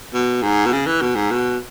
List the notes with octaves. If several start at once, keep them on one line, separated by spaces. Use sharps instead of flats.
B2
G#2
B2
C#3
E3
B2
G#2
B2